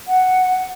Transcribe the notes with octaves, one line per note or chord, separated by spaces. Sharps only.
F#5